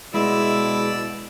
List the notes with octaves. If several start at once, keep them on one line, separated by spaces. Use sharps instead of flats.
B2 G#3 E4 D5 E6